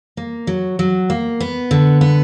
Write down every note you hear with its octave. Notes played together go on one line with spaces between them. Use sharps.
A#3
F#3
F#3
A#3
B3
D3
B3